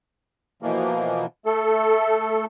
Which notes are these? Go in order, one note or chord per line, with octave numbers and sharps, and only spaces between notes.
B2 E3 F3 A#3
A3 A4